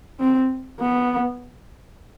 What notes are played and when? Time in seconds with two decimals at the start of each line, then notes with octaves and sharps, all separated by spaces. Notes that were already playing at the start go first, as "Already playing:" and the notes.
0.20 C4
0.80 B3